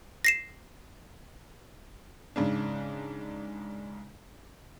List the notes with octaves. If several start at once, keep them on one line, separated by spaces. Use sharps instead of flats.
A#6 C7 E7
G#2 C#3 D4